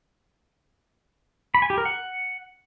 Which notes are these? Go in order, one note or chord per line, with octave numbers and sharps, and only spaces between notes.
B5
G#5
G4
A#4
F#5